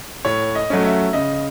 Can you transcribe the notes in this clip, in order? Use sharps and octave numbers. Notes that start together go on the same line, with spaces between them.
A2 C#5
D#5
F#3 A3 C#4
E5
C#3 D#5